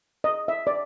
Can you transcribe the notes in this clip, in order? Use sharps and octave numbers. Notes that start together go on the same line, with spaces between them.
D#5
E5
D5